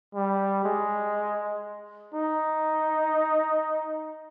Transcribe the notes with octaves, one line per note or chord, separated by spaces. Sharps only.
G3
G#3
D#4